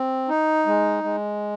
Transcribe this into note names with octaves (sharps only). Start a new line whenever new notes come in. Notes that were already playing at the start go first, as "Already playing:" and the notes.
Already playing: C4
D#4
G#3
G#3